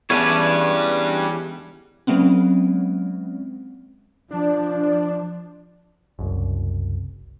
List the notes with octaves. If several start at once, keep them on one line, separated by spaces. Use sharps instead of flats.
E2 E3 G3 G#3 C#4 D4 B4 C#5
F#3 G#3 A#3 C4 C#4
F3 D4
F#1 C2